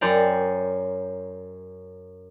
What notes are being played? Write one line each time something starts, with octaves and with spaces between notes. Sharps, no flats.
F#2 C#4 C5 D5 G5 A#5